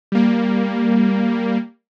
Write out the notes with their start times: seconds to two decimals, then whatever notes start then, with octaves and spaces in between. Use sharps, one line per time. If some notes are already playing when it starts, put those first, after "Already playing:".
0.12 G3 A#3